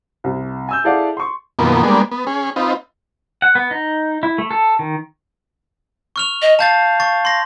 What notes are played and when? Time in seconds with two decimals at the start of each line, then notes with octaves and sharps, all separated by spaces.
0.24 C2
0.69 G#5 E6 G6
0.84 E4 G#4 A4 D5 F5 F#5
1.17 C6 C#6
1.59 F#2 B2 D#3 F3 A#3 B3
1.83 G3 G#3 A#3 B3 D4
2.11 B3
2.27 C#4 G#4
2.56 C4 D#4 F4 B4
3.42 F#5
3.55 B3
3.71 D#4
4.23 E4
4.38 A3
4.51 A4
4.79 D#3
6.16 C#6 F6 F7
6.42 D#5
6.59 F5 A5 G6 A6
7.00 C#6 A6
7.25 C6 A#6